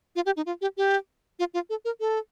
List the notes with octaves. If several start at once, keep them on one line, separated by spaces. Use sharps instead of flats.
F4
G4
D#4
F4
G4
G4
F4
F4
A4
A#4
A4